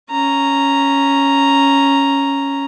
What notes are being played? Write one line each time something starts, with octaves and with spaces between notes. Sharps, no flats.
C#4 A#5